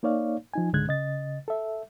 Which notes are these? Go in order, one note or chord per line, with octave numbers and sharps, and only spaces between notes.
A#3 D#4 C#5 D5 F5
F3 D#4 G#5
C#2 G#2 D3 G#3 F#6 G#6
C#3 D#5 A6
A4 E5